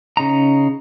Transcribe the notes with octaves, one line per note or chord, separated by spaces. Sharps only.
C#3 D#4 A#5